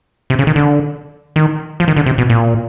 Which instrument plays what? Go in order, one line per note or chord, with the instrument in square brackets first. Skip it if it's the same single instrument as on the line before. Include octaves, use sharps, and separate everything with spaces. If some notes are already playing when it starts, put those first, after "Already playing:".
[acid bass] C3
C#3
D#3
D3
D#3
F3
D#3
D3
C3
B2
A#2